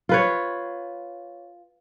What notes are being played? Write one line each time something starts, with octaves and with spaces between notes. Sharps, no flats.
F4 B4 C#5